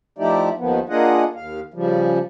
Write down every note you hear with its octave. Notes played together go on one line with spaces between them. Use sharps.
F3 A3 D#4 E4 G4 D5
D#2 D#3 F3 B3
A#3 D4 F4 G#4 D#5 F#5
D#2 F5
C#3 F3 G3